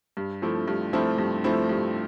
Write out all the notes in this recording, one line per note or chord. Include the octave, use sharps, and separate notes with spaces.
G2
F3 A3 C4 E4
G2
F3 A3 C4 E4
G2
F3 A3 C4 E4
G2